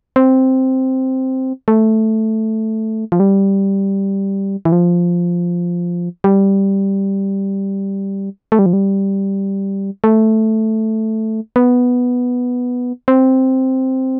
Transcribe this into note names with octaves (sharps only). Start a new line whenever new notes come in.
C4
A3
F3
G3
E3
F3
G3
A3
G3
F3
G3
A3
B3
C4